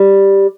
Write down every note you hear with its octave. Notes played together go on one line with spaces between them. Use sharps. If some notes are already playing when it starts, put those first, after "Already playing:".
Already playing: G3